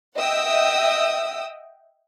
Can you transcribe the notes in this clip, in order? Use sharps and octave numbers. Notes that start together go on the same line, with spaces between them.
D#5 E5 F#5 G5 D#6 E6